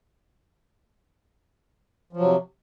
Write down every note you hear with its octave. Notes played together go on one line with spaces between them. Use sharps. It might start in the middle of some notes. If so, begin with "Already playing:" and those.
C3 F3 F#3